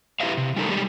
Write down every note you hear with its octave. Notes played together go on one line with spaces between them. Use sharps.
E4 G4 B4 E5 F5
C3
G3 A3 D#4 A4 A#4
G3 G#3 G4 D5